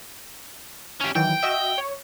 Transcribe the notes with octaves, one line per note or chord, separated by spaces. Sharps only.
C#4 G4
D#3 E3 F#3 G5
F#4 D#5 E5
C#5